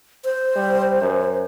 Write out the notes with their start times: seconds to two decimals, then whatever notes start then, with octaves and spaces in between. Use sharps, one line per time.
0.25 C5
0.56 G3
1.01 F#2